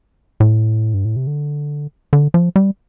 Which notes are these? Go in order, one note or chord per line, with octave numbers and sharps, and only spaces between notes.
A2
G2
A2
C3
D3
D3
F3
G3